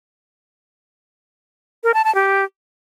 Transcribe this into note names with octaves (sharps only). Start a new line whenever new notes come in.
A#4
A5
A5
G4